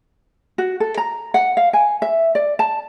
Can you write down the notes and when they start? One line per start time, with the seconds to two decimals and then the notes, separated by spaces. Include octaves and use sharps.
0.58 F#4
0.80 A4
0.97 A#5
1.34 F#5
1.57 F5
1.73 G#5
2.02 E5
2.35 D5
2.59 A5